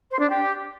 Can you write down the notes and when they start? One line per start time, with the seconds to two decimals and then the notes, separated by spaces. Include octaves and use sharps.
0.10 C5
0.20 D4
0.30 G4